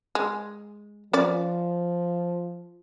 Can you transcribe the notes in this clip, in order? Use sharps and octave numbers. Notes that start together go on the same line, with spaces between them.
G#3
F3 C#4 D5